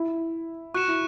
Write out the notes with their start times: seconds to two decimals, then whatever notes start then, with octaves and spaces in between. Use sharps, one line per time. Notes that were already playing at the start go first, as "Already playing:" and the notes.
Already playing: E4
0.74 F#4 C#6 F#6 C#7 E7
0.88 E4